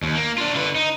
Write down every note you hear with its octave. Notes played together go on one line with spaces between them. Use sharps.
D#2
A#3
D4 F4
D3 B4
D#4